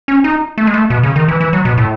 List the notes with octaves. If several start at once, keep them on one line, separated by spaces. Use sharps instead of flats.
C#4
D#4
A3
G#3
A3
B2
C#3
D#3
E3
E3
F#3
B2
A2